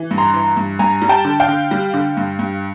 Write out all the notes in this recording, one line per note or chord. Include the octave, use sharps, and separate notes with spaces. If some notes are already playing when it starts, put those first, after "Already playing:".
Already playing: E3
G2
A#5 C6
E3
G2
G2 G#5 A#5
G3
G5 A5
D3
F5 G5
D3
G3
D3
G2
G2